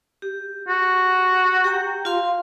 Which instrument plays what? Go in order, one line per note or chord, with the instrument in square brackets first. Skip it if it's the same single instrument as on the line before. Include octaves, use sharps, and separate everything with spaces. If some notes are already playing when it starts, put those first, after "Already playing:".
[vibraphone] G4
[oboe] F#4
[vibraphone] G4 G5 A#5
F4 F5 C6